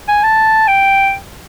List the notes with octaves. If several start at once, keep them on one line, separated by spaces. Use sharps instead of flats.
G#5
A5
G5